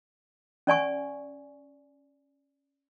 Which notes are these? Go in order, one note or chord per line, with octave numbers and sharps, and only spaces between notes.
C#4 D5 G#5 C#6